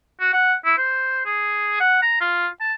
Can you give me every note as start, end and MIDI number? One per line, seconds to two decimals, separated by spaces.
0.20 0.30 66
0.33 0.54 78
0.65 0.74 64
0.78 1.22 72
1.25 1.80 68
1.80 1.98 78
2.02 2.20 82
2.20 2.47 65
2.61 2.73 81